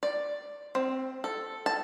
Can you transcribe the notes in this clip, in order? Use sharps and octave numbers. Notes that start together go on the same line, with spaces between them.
D5
C4
A4
A5